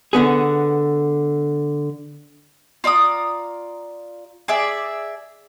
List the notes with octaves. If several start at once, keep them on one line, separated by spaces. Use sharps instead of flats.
D3 B3 G#4
F4 D5 A#5 D#6
G#4 D5 E5